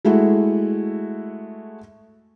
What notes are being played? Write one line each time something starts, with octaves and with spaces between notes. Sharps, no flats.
G#3 A3 E4 F#4